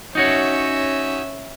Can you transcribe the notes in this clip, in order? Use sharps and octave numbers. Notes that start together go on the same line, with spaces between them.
C#4 D#4 F#4 C#5 E5